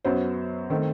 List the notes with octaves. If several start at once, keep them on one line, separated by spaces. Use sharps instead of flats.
F#2 F#3 B3 C5
D#3 A3 C4